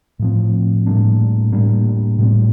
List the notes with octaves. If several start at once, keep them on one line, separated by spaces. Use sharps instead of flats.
A2 F3 C4
A2 G3 A#3 D4
A2 G3 A#3 D4
A2 G3 C4